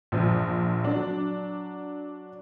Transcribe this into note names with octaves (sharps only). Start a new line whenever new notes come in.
A#1 F3
F#3 D4